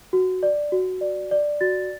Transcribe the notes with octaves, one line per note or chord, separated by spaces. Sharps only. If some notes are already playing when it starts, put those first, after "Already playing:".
F#4
D5
F#4
D5
D5
F#4 A6